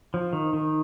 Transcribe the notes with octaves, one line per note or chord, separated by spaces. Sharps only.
F3
D#3
D#3